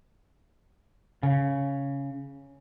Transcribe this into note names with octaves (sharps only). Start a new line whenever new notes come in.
C#3